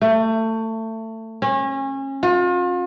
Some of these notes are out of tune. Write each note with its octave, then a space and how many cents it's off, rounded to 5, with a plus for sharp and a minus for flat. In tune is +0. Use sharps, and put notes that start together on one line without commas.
A3 +25
C#4 -30
F4 +40